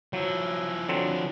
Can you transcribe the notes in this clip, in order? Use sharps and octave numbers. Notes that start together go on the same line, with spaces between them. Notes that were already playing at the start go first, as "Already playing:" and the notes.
F3 F#3 E4
D3 F#3 C4